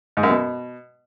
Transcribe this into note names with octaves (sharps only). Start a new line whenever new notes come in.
G#2
F#2
B2